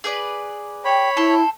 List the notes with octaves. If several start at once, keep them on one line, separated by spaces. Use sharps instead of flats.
G#4 B4 D5
C#5 G5 B5
E4 A4 C5